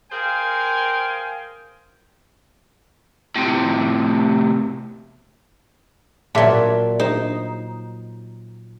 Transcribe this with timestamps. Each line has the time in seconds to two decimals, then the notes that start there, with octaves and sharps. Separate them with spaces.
0.11 G#4 A#4 C5 F5 G5 G#5
3.36 A2 C3
6.35 A#2 F#3 D5 E5 A5
6.99 D#4 C5